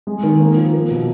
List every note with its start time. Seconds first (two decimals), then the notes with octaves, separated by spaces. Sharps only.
0.07 G#3
0.23 D#3
0.40 A#3
0.57 F3
0.74 A#3
0.91 B2